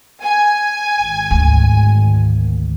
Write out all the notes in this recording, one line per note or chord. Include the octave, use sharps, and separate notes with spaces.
G#5
G#1
D2